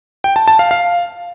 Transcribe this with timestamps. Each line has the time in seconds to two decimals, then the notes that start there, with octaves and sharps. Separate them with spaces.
0.24 G5
0.36 A5
0.48 A5
0.59 F5
0.71 F5